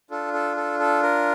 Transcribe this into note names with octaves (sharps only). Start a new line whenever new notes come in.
D4 F4 A4
A4
A4
A4
A#4